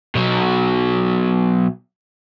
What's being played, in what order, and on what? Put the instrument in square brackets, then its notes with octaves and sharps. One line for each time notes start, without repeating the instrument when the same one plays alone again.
[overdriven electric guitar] B2 F#3